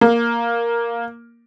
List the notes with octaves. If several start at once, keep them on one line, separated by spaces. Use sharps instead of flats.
A#3